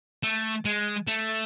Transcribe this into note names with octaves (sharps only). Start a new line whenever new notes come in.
A3
G#3
A3